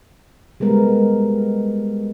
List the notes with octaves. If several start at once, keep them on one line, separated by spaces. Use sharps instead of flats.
G3 G#3 B3 A#4